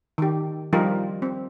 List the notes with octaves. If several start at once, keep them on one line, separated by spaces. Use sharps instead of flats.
D#3 G4
F3 G3 D#4 F4 G4 A#4
C4